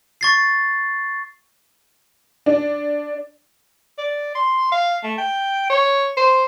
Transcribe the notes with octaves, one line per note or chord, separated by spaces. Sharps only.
C#6 A6 C7
D4
D5
C6
F5
A3
G5
C#5
C5